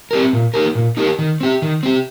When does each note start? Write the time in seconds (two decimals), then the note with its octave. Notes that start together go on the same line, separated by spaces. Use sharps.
0.11 C4 G4 A#4
0.33 A#2
0.54 A#3 D#4 G4 A#4
0.75 A#2
0.97 A#3 D#4 G4 A#4
1.19 D#3
1.41 C4 G4
1.62 D#3
1.83 C4 G4